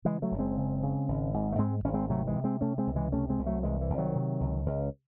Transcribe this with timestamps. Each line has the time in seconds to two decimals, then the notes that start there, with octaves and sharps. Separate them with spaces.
0.05 C#3 E3 G#3
0.22 F#3 A3
0.31 F#1
0.39 G#3 C4
0.57 C#3
0.83 C#3
1.08 G#1
1.34 G#2
1.52 A3
1.58 G#2 G#3 C4
1.84 G#1 C#4
1.94 G#3 C4
2.10 C3 F#3 A3
2.27 E3 G#3
2.35 C3
2.44 G#3 C4
2.61 C3 A3 C#4
2.78 G#3 C4
2.87 C#2
2.96 E3 G#3
3.12 C3 A3 C#4
3.30 G#3 C4
3.38 C2
3.46 F#3 A3
3.63 C2 E3 G#3
3.81 E3
3.90 C2
3.98 D#3 F#3
4.15 C3
4.41 C#2
4.66 C#2